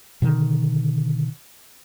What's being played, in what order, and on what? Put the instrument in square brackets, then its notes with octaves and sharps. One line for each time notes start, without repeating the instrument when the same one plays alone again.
[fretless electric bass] B2 D3 D#3